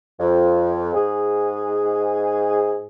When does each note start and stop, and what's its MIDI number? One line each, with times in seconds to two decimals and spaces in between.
0.19 0.93 41
0.94 2.87 44
0.94 2.87 68